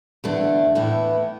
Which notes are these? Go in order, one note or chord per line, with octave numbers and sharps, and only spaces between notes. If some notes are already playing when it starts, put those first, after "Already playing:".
E2 D3 A3 D4
A2 E3 B3 E4